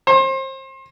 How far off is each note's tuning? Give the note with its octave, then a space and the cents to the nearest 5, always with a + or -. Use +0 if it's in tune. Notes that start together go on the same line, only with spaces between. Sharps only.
C5 +30